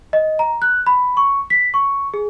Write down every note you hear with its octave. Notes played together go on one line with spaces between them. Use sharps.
D#5
A#5
F#6
B5
C#6
B6
C#6
G#4